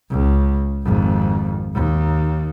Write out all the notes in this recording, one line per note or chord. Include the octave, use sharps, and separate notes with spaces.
C#2
G#1 F2
D#2